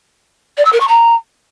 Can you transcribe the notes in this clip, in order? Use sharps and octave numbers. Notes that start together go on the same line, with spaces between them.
D5
E6
A#4
C#6
A#5